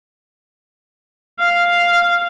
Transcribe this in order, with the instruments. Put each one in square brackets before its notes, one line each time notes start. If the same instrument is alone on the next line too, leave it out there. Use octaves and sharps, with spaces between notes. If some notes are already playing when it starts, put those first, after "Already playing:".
[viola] F5